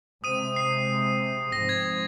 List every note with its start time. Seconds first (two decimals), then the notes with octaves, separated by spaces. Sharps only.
0.24 C3 G#3 C4 D#6 D#7
0.56 C7
1.52 G#2 F3 C4 A#6
1.69 G#6